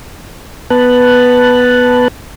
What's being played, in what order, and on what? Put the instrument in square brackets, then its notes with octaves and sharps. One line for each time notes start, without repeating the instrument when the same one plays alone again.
[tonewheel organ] B3 B4 A5 F#6